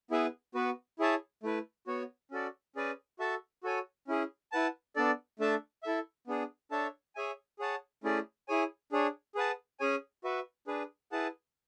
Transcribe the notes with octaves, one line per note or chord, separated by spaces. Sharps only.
B3 E4 G#4 B4 E5
B3 F#4 B4
E4 G#4 C#5 E5 A5
A3 E4 B4
B3 F#4 C#5
C#4 F#4 A4 D5
C#4 G#4 B4 D5 G#5
F#4 A4 E5 A5
F#4 A4 C#5 G#5
C#4 E4 G#4
E4 B4 F#5 A5
B3 D4 A4 D5
A3 D4 A4 E5 A5
E4 A4 E5
B3 D4 G#4
D4 A4 C#5 E5 A5
G#4 C#5 E5 G#5
G#4 C#5 F#5 A5
A3 C#4 E4 G#4 D5
E4 G#4 C#5 G#5
D4 G#4 C#5
G#4 B4 F#5 A5
C#4 G#4 C#5 G#5
F#4 B4 E5
D4 G#4 B4
E4 G#4 B4 F#5 A5